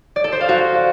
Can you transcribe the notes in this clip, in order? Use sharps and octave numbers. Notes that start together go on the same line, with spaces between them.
D5
A4
C5
F5
F#4